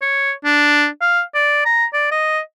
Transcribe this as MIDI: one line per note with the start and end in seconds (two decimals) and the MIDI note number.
0.02 0.32 73
0.45 0.87 62
1.02 1.22 77
1.35 1.64 74
1.66 1.85 82
1.93 2.09 74
2.12 2.40 75